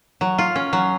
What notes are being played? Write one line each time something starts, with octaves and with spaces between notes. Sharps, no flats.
F#3
F4
C#4
F#3